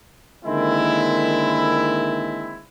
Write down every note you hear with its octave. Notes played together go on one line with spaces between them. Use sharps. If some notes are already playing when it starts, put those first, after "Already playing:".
D3 D#3 G#3 A#3 C4 E4